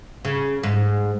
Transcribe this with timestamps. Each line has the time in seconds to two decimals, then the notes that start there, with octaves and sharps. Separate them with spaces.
0.25 C#3
0.63 G#2